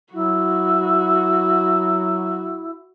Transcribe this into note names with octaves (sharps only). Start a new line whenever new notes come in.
F#3 E4 F#4